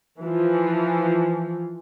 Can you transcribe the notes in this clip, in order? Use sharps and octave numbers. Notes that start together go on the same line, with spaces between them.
E3 F3